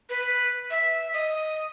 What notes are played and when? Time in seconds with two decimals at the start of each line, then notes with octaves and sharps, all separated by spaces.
0.10 B4
0.71 E5
1.14 D#5